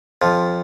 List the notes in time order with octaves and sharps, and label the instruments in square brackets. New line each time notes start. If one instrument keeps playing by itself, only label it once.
[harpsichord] F2 F3